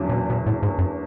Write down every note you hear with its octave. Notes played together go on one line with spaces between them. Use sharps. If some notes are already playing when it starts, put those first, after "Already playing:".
Already playing: F#1 E2 D3 F#3 C#4
B2
B2
A2
G#2
F#2